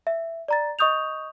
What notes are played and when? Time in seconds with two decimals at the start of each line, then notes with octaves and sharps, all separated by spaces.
0.07 E5
0.48 D5 A#5 A6
0.79 D#5 C#6 D#6 G6 F7